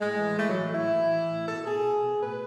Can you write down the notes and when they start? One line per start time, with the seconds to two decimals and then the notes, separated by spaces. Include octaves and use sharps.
0.01 A2 G#3
0.19 E3
0.38 E3 A3
0.50 F#3
0.56 A2
0.74 A2 E4
0.93 E3
1.12 E3
1.30 A2
1.48 B2 A4
1.66 B2 G#4
1.85 B2
2.03 B2
2.22 A2 B4